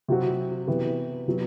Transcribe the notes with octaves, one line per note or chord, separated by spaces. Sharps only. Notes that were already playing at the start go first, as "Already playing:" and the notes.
C3 F#3 C4 F#4
C3 E3 B3 F#4 B4
C3 F#3 B3